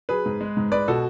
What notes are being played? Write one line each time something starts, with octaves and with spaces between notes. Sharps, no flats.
F#3 G#4 B4
G#2
G#3
G#2
G#3 B4 D5
B2 F#4 A4